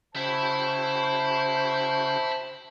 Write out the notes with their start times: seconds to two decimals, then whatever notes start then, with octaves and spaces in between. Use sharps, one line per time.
0.15 C#3 F#4 C5 E5 G5 A5 B5